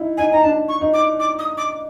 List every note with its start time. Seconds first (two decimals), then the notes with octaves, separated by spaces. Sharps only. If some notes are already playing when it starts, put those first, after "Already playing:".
Already playing: D#4 E4
0.17 D#4 G#5
0.31 D#4 A#5
0.43 D4 A5
0.69 C#6
0.81 D#4
0.94 D6
1.20 D6
1.39 D#6
1.58 D6